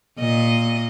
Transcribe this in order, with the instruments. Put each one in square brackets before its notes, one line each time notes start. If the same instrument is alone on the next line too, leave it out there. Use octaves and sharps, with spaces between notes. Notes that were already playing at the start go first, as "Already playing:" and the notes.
[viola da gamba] A#2 D#5